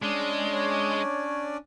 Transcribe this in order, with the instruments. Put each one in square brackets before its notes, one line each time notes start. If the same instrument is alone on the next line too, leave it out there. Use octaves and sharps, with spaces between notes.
[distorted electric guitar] G#3 [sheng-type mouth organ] C#4 D4 D5
[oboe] C#5